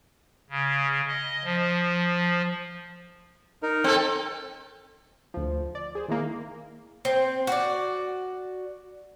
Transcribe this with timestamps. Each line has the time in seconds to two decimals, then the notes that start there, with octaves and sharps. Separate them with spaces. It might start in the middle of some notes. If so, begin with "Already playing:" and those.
0.50 C#3
1.08 D#5
1.44 F3
3.63 D#4 A#4
3.84 C4 A4
5.34 D2 F3
5.75 D5
5.95 G#4 C5
6.08 D#3 E3 G#3 A#3
7.05 C4
7.47 F#4 D5